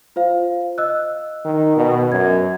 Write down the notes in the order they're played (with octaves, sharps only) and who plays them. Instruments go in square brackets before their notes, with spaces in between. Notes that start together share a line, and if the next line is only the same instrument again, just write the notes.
[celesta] F4 C5 F5
D#5 E6 F#6
[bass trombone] D#3
B2
[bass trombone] F#2 [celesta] G#6